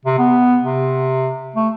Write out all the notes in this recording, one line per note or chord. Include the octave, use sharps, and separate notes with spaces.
C3
B3
C3
A3